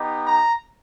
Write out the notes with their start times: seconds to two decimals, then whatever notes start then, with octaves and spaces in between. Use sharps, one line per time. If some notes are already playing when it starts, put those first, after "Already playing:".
Already playing: B3 D#4 G4
0.26 A#5